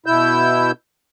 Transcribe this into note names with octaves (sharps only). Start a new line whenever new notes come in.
B2 E4 E6 G6